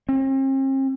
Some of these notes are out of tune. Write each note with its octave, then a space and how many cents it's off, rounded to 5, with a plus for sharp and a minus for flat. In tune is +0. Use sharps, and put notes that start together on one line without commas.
C4 +45